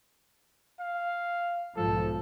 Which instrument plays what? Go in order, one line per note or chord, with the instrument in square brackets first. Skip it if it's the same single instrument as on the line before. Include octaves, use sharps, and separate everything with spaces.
[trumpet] F5
[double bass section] B1 G#2 F3 [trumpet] A4